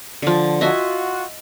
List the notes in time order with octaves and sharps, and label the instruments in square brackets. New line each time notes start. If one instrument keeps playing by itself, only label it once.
[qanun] D3 F3
[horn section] F4 F#4 [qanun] D#5 E5 G#5